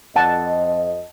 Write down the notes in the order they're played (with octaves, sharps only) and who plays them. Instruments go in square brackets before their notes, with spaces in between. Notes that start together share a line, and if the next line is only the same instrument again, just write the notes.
[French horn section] F2 D#5 [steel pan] F#5 A5